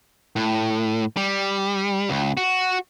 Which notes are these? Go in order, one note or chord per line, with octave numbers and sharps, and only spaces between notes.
A2
G3
C#2
F#4